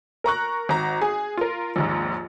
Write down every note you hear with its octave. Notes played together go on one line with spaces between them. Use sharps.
A#4 A#5 C#6 F#6
G#1 A#5
G#4
F4 A#4
A#1 D#2 G#2